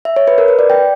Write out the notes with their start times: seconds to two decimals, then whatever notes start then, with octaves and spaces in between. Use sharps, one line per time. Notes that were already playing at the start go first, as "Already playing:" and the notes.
0.05 E5
0.16 C#5
0.28 B4
0.38 A#4
0.48 B4
0.59 D5
0.70 G5